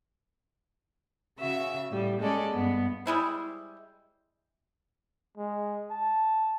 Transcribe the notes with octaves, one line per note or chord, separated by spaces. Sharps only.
C#3 F#4 E5 E6
A2 G3
G#3 C#4 A4 D5
G2 B3
G3 G#3 E4 C5
G#3
A5